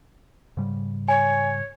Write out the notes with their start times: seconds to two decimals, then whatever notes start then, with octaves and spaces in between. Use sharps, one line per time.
0.57 G#2 C#3 G3
1.08 C#5 G#5